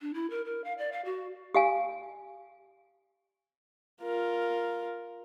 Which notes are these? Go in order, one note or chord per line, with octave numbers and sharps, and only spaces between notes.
D4
E4
A#4
A#4
F5
D5
F5
F#4
G4 F5 G#5
F4 A#4